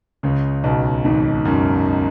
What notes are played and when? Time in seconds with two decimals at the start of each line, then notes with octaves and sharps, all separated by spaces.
0.23 C#2 C#3
0.64 B1 B2
1.05 G#1 G#2
1.45 F#2